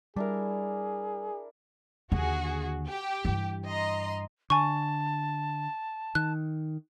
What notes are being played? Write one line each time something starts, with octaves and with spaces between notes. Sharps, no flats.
G3 D4 E4 G#4 A#4
D#2 D3 F#4 G#4
G4
G2 E3
D#5 A#5 C6
D3 G#5 A5 C#6
D#3 F#6